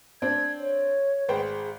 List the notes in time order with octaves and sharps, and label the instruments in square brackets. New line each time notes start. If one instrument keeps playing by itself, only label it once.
[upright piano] C4 D4 [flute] G#6
[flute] C#5
[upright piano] G#1 C5 G5 [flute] G#4